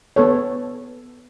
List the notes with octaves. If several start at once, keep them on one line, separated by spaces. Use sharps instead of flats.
B3 A4 C#5